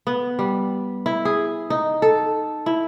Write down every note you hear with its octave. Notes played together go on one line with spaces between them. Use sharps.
B3
G3
E4
G#4
D#4
A4
E4